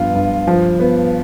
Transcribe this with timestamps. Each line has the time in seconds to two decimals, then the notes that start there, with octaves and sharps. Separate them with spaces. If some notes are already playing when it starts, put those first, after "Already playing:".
Already playing: G2 F3 B3 F4
0.14 G2
0.47 F3
0.80 B3